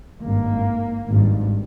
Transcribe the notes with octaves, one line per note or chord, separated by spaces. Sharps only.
G#1 G2 A#3
G#1 G2